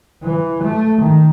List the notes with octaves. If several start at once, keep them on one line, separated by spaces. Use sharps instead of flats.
E3
A3
D#3